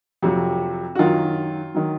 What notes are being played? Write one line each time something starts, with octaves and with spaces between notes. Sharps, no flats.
F2 C3 F#3
F#4
F#2 D#3 F#3 F4
D#3 F#3